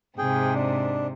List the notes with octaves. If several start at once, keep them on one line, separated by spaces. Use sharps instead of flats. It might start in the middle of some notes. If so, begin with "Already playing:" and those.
G#2 C3 G#4 G5
D4